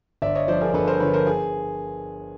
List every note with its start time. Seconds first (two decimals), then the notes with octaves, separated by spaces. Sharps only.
0.22 G1 D5 E5
0.35 C#5 D#5
0.48 G2 D3 F3 C5 D5
0.61 G#4 A#4
0.74 G1 A4 B4
0.87 A#4 C5
1.00 G2 D3 F3 B4 C#5
1.13 A#4 C5
1.27 G#4